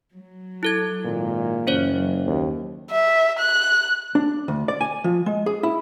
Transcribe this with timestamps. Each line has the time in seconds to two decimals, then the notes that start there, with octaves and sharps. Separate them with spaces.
0.14 F#3
0.63 E4 A4 G#6
1.05 G#1 A#2
1.67 F#1 F#2 E3 C#4 C5 C#5
2.26 D#2
2.91 E5
3.39 F#6
4.15 D4
4.48 D2
4.68 D5
4.81 G#5
5.04 F3
5.26 G#3
5.46 G#4
5.63 E4